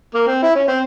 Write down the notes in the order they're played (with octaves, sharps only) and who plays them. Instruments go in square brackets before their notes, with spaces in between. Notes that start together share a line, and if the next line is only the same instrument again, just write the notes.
[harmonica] A#3
C4
E4
C#4
C4